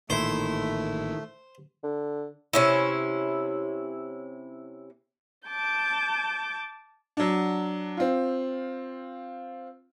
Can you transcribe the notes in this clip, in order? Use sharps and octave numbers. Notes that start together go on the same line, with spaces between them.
A1 A#2 D#3 A3 E4 C5
D3
C3 C#4 E4
A5 D6 G6
F#3 D4
C4 F4